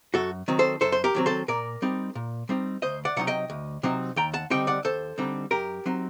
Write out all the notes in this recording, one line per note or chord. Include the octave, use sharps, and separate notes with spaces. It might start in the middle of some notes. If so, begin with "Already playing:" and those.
F#2 F#4 A4
D#3 F#3 C4
A4 C5
F#2 A4 C5
C5
G4 A#4
D#3 F#3 C4
A4 C5
A#2 A#4 D5
G3 C4 D#4
A#2
G3 C4 D#4
D2 C5 D#5
D5 F#5
C3 F#3 C4 D#4 F#5
D#5 G5
D2
C3 F#3 C4 D#4
D#2 G5 A#5
F#5 A5
D3 G3 C4 D#4 D#5 G5
D5 F#5
D#2 A4 C5
D3 G3 C4 D#4
F#2 G4 A#4
F#3 C4 D#4